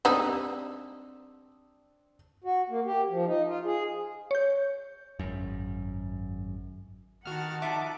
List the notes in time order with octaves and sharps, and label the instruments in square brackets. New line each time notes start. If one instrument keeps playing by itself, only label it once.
[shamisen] G3 G#3 D#4 [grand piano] C4 D4 [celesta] D5 D#6 E6
[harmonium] F#4
A#3
G4
F3
D#4
F4
G#4
[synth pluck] C#5 G6
[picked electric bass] G#1 F#2
[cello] D#3 [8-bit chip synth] F#4 F6 [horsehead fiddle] F#5 A5
[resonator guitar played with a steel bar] F3 D#4 E5 [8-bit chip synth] D6